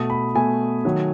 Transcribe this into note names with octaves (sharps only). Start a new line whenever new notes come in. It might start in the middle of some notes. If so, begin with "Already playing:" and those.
Already playing: B2 A3 D#6
B5
B2 A3 G#5
D#3 F#3 A3